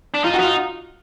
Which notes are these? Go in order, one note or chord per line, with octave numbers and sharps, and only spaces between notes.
D4
D#4 F4
F#4
D#4 F4